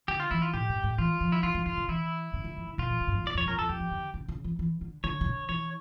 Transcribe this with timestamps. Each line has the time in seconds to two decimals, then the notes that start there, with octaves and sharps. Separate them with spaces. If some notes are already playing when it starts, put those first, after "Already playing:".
0.08 D3 G4
0.20 F4
0.31 E3 E4
0.42 F4
0.54 A2 G4
0.69 G2
0.84 A2
0.98 E3 F4
1.21 F3
1.32 E4
1.43 E3 F4
1.54 E3
1.66 D3 F4
1.77 C#3
1.88 E3 E4
2.34 C#3
2.44 D3
2.57 E3
2.67 D3
2.78 A#2 F4
2.90 E3
3.01 C#3
3.07 G2
3.12 F2
3.24 E2 D5
3.34 F2
3.38 C#5
3.46 F2 A#4
3.58 F2 A4
3.69 F2 G4
3.80 E3
3.91 D3
4.14 C#3
4.28 C#3
4.44 E3
4.59 E3
4.81 D3
5.04 D3 C#5
5.21 C#3
5.26 D3
5.49 E3 C#5